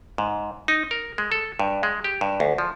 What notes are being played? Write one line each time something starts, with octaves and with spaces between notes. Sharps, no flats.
G#2
D#4
A#4
G#3
A4
G2
G#3
G4
G2
D2
F3